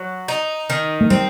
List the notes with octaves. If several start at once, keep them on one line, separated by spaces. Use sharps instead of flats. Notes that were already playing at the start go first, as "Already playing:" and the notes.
Already playing: F#3
D#4
D#3
A3
G3 C4